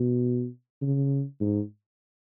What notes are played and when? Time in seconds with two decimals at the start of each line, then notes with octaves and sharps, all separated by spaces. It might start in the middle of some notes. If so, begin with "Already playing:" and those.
Already playing: B2
0.82 C#3
1.41 G#2